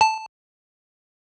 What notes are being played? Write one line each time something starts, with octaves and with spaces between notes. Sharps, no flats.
A5